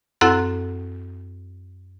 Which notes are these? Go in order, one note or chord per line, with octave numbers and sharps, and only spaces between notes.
F#2 C4 E4 A4 F#5 F#6